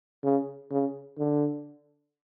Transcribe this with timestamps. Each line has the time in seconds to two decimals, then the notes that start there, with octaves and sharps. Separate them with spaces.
0.23 C#3
0.70 C#3
1.18 D3